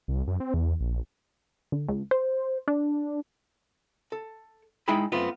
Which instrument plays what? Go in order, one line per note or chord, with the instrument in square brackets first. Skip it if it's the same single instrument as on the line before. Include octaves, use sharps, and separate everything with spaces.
[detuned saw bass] C2
F#2
C4
E2
A#1
[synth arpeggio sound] D3
C#2
C5
D4
[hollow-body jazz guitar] A4
G#3 D#4 E4 G5 G#5 B5
F#2 A3 B3 C4 F4